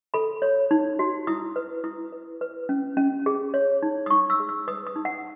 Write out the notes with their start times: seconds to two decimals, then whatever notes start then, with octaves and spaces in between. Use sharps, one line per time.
0.14 A4 B5
0.42 C#5
0.71 D#4
0.99 F#4
1.27 E4 D#6
1.56 B4
1.84 E4 D#6
2.12 B4
2.41 B4
2.69 C#4
2.97 C#4
3.26 G#4
3.54 C#5
3.83 D#4
4.06 D#6
4.10 D#4 C#6
4.30 E6
4.40 G#4
4.49 E6
4.68 B4 D#6
4.87 D#6
4.96 D#4
5.05 F#5